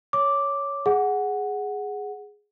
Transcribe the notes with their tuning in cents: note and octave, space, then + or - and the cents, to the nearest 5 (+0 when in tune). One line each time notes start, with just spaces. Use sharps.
C#5 +5 D6 +0
G#4 +0 F#5 +0